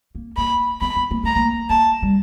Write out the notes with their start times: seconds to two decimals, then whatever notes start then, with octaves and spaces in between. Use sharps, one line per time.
0.15 A#3
0.37 A#3 B5
0.81 B3 B5
0.96 B3
1.11 A#3
1.23 A3 A#5
1.36 A#3
1.70 A#3 A5
2.02 G3